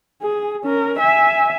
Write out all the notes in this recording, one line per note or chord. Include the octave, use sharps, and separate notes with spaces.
G#4
C#4 A#4
E5 G#5